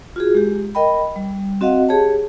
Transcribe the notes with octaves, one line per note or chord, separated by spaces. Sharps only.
F4 F#4 G#4
G#3 G4
A#4 D#5 G5 B5
G3
C4 F#4 D#5 F5 F#5
G4 G#4 C#5 A5